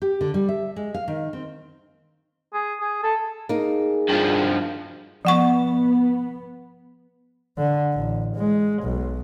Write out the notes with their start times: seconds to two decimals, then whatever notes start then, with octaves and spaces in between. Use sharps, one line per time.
0.02 G4
0.21 D3
0.34 G3
0.49 E5
0.76 G#3
0.94 F5
1.08 D#3
1.33 C4
2.53 G#4
2.80 G#4
3.03 A4
3.49 A#3 D#4 G#4
4.09 G2 F3
5.25 F3 B3 F#5 C#6
7.58 D3
7.93 A1
8.36 G#3
8.83 B1